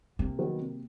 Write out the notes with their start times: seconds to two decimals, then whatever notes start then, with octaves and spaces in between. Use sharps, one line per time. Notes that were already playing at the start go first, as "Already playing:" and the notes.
0.19 C3 A#3
0.39 D#3 F#3 B3
0.59 C3